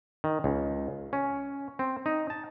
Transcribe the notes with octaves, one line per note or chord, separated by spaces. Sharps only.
D#3
C#2
C#4
C4
D#4
A5